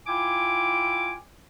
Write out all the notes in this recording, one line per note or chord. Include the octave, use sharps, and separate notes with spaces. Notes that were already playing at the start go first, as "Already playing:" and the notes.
E4 F4 G5 G#5 D6